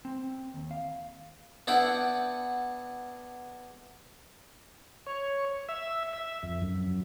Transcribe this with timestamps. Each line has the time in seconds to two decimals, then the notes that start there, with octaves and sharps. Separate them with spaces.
0.05 C4
0.54 D#2
0.71 F5
1.67 B3 D4 E4 F#5 G5
5.07 C#5
5.69 E5
6.13 E5
6.43 F2
6.62 F#2